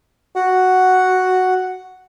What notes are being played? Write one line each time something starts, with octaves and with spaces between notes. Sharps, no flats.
F#4 F#5